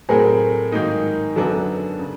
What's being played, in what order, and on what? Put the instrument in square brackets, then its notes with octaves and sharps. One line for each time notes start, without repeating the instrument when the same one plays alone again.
[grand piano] A2 F#3 A3 C4 [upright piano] G#4 A#4
[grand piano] G#2 D#3 F#3 A#3 D#4
[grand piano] F#2 D3 F#3 B3 D4 [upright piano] A4
[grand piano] C#3